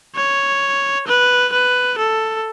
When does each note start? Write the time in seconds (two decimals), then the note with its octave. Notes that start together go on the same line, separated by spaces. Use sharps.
0.16 C#5
1.07 B4
1.52 B4
1.98 A4